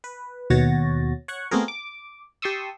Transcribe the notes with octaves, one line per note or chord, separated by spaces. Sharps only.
B4
D#2 B2 F#4 C#5 A6 A#6
C#5 F#5 C#6
A3 B3 C4 F#4 G#4 A#4
D6
G4 A5 C6 C#6 D#6 E6